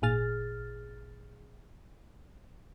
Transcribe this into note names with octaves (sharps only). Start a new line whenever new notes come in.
G#1 A#2 G#4 F6 A6